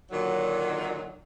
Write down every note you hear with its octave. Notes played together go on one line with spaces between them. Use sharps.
A#2 D3 D#3 F#3